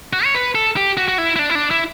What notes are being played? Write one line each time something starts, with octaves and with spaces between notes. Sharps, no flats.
F#4
C#5
B4
A4
G4
F#4
F#4
E4
E4
D4
E4
D4
E4